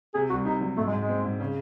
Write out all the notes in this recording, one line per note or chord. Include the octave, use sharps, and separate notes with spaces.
C3 G#4
C2 F#4
C3 D#4
F#3
G#2 A3
G#3
G#2
G#3
C4
G#2
C#3